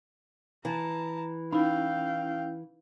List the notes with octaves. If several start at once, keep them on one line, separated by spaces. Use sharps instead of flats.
E3 A5 A#5
C#4 D#4 E4 F5 G5